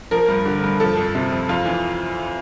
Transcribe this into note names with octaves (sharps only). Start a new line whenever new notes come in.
F3 A#4
G2
D3
G2
F3 A4
F2
C3
F2
F2 F4
E3